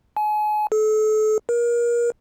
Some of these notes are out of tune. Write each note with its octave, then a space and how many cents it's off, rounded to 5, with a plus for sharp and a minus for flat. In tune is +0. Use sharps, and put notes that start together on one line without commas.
G#5 +35
A4 -35
A#4 +30